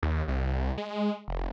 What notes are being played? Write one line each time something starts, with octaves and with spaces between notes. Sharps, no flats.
D#2
C2
G#3
F1